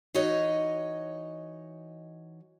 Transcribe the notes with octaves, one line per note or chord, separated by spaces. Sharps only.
E3 D#4 F#4 C#5 D#5